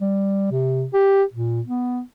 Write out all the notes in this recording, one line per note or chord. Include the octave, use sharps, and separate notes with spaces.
G3
C3
G4
A#2
B3